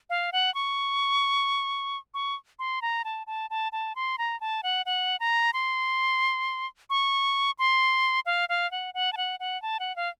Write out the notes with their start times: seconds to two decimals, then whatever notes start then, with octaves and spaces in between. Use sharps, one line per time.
0.10 F5
0.32 F#5
0.54 C#6
2.14 C#6
2.59 C6
2.82 A#5
3.05 A5
3.27 A5
3.50 A5
3.72 A5
3.96 C6
4.18 A#5
4.41 A5
4.63 F#5
4.86 F#5
5.20 A#5
5.53 C6
6.90 C#6
7.59 C6
8.26 F5
8.49 F5
8.71 F#5
8.94 F#5
9.13 A5
9.17 F#5
9.40 F#5
9.62 A5
9.80 F#5
9.96 F5